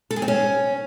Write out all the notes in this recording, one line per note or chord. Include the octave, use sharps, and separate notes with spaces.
A4
G#4
C4
C#4